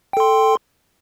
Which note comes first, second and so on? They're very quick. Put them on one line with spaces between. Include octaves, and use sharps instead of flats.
G5 A4 C6